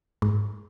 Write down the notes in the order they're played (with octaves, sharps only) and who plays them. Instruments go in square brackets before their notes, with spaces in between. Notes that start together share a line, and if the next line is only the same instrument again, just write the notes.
[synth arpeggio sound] G#2